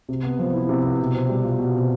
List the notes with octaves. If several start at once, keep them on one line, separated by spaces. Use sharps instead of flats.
C3
B3
F3
E4
C3
B3
B2
C4
G3
F4
B2
C4